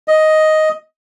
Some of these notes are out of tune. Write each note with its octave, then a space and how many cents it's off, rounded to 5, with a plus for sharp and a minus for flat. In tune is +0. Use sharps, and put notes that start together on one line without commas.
D#5 +5